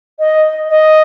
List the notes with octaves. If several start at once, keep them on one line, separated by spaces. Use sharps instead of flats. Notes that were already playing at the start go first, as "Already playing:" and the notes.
D#5
D#5